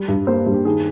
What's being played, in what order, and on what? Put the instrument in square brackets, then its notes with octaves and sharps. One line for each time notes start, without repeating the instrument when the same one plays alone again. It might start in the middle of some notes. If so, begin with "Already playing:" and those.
Already playing: [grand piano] G3
G2
A#3 C5
G2
G4
D#3 G#4